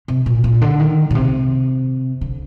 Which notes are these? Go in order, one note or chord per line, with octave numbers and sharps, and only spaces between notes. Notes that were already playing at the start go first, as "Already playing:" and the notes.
C3
A#2
A#2
D3
D#3
A#2
C3
D3